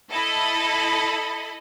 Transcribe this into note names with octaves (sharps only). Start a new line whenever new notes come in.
E4 A4 D#5 B5